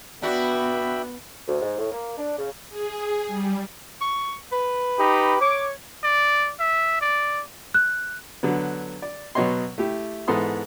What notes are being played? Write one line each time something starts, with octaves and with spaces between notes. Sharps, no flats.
B3 D4 F#4 E5 G5 B5
D2
G#2
A2
A#3
D4
C#3
G#4
G3
C#6
B4
D#4 G4 B5
C#5 D6
D5
E5
D5
F#6
D3 F#3 B3
D5
B2 F#3 B3 C#5 D#5 C6
A3 E4 G4
G#2 E3 B3 A4 C6 D#6